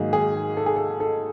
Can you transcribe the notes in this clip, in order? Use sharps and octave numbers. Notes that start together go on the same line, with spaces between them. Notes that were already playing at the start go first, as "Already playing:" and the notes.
Already playing: G#2 D#3 F#3 A#3 D#4 G#4
G#4
A4
G#4
A4
A4